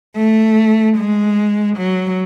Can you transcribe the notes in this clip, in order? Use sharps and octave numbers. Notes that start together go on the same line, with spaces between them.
A3
G#3
F#3